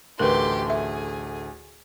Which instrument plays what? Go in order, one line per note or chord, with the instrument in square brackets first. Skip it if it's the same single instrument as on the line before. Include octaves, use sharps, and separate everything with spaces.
[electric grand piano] A1 D2 A3 [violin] G4 C6 [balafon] A#4 B4
[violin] G#4 [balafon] E5